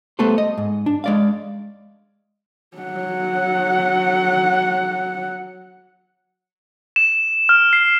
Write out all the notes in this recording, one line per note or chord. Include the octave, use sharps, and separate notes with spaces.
G3 A3 B3 A4 B4 C5
D#5
G#2
D4
G#3 D5 F5
F#3 F#5
E7
F6
C7